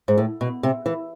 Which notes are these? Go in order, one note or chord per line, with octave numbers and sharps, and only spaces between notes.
G#2
A2
B2
C3
E3